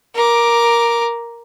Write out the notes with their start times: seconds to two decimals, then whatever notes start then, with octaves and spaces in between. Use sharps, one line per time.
0.15 A#4 D6